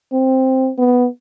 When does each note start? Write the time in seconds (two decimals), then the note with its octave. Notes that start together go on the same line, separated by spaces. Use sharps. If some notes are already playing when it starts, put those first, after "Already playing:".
0.12 C4
0.78 B3